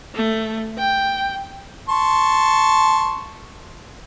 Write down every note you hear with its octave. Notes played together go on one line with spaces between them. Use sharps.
A3
G5
A5 C6 C#6